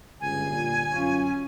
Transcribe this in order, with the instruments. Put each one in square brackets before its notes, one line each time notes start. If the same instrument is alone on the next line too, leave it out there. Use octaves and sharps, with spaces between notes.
[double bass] G1 [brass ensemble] C#2 [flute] G#5
[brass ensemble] A#2
[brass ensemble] F#2 F4 [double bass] C#4